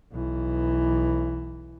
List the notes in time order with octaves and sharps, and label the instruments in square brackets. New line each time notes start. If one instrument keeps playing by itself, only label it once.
[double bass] B1 E3